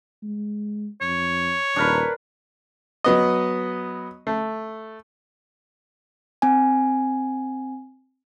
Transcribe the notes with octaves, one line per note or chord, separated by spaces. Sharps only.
G#3
F2 C#5
D#1 D4 A#4 B4
F#3 B3 D#5
A3
C4 G#5